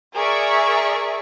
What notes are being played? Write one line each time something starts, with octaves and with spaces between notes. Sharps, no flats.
G#4 A#4 D5 E5 C#6